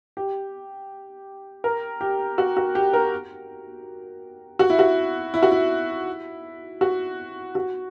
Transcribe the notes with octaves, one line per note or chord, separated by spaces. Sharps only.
G4
A#4
G4
F#4
F#4
G4
A#4
F#4
E4
F#4
E4
F#4
E4
F#4
F#4